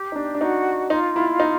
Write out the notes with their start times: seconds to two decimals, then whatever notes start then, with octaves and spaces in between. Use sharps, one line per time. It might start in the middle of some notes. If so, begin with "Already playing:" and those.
Already playing: G4
0.12 D#4
0.16 D4
0.35 D4
0.41 D#4 F#4
0.90 D#4 F4
1.16 E4
1.40 D#4